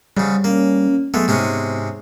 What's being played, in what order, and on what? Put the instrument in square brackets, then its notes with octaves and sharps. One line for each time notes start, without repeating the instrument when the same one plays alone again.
[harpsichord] G#2 C#3 [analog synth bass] G3
[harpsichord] A#3 [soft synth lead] C#4
[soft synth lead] F#3 [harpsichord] G#3 A3 [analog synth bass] B3
[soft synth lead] G#2 [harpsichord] C3 G#3 C#4